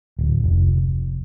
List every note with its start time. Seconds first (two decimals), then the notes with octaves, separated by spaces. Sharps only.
0.19 D1
0.44 F1